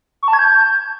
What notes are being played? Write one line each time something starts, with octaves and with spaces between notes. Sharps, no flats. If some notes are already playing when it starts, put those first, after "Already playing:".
C#6
A5
G#6
G6